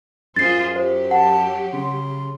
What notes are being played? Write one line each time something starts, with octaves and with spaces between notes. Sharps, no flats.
F#2 F4 G#4 C5 A6 C7
F#3 G4 C5
F#5 A5
C#3 C6